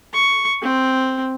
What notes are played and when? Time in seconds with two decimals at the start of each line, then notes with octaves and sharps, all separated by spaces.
0.14 C#6
0.62 C4